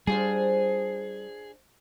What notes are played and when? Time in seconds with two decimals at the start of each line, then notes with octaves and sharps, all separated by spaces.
0.07 G3 D4 F4 G#4 C5